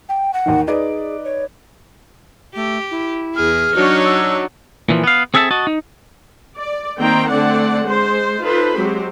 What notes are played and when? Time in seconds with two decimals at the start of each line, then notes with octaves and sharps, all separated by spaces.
0.09 G5
0.33 F#5
0.46 D#2 D#3
0.67 D#4 G#4 B4 D5
1.24 C#5
2.56 A3 G4
2.91 E4
3.36 E2 G#4 F6
3.75 F#3 D4 D#4 F#4 C#5
4.05 E6
4.89 A#2 E3 F3
5.04 B3 F5
5.34 C4 G#4 A4 E5 F5 A5
5.51 F#4 D#5 A5
5.67 D#4
6.58 D5
6.99 D#3 A#3 C4 C5 G5 A#5
7.30 D3 A3 C4 D4 D5 F#5
7.85 G#3 C5
8.40 D#4 F4 A4 B4 C5 B5
8.75 F#3 G#3 C4 G4 C5